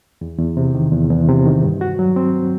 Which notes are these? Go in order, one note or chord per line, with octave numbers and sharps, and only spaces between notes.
E2
E2
C3
D#3
E2
E2
C3
D#3
G2
F#4
F#3
C4